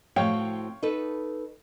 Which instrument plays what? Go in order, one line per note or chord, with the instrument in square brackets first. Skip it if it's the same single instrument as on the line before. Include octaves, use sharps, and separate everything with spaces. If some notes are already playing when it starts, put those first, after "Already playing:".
[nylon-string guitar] A2 C4 F#4 [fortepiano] C#5 F5 G5
[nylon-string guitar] D#4 A4 B4